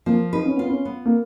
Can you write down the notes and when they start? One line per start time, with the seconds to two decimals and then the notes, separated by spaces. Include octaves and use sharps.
0.06 F3 A#3
0.33 D#4 B4
0.45 C#4
0.57 B3 F4
0.69 C#4
0.85 B3
1.06 A#3